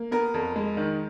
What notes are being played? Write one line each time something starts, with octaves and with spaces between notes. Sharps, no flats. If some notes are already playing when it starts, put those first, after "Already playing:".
Already playing: A#3
B3 A#4
F2
G#3
D#3